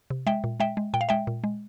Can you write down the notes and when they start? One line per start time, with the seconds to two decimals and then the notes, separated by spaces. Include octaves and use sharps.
0.10 C3
0.27 G#3 E5 G5
0.44 A#2
0.60 G#3 E5 G5
0.77 G#3
0.94 A#2 G5
1.01 F5
1.09 G#3 E5 G5
1.27 A#2
1.44 G#3